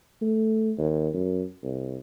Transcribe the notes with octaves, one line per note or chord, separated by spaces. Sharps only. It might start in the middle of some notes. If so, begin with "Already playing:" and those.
A3
D#2
F#2
C2